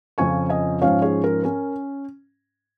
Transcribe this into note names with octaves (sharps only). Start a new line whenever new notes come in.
F2 C#3 F3 C#4 G#5 C#6
D#5 G#5
G#2 F3 C#4 C#5 F5
G#4 C#5
A#4
C#4 A#4